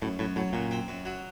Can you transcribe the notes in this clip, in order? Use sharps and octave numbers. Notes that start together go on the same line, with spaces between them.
F#2 A2
F#2 A2
A2 F#3
F#2 A#2
C4
F#2
F#3